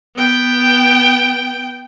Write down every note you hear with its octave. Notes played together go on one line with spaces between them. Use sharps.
B3 G5